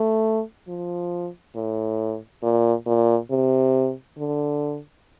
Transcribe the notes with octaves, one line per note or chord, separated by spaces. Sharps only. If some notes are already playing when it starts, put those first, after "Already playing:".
Already playing: A3
F3
A2
A#2
A#2
C3
D3